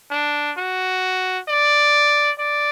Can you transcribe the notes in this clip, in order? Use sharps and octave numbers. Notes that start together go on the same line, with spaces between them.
D4
F#4
D5
D5